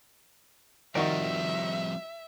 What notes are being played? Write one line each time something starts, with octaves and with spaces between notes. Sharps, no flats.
D#3 F3 G3 C4 D#4 F#4 D5 E5